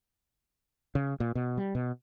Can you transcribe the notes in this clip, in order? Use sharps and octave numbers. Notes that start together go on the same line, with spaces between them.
C#3
A#2
B2
G3
B2